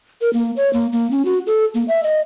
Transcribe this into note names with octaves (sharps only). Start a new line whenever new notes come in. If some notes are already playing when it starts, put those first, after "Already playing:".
A#4
A#3
C#5
A#3
A#3
C#4
F#4
A4
A#3
E5
D#5